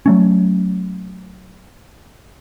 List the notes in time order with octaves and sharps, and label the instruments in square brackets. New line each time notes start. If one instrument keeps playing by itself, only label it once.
[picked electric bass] F#3 A3 C#4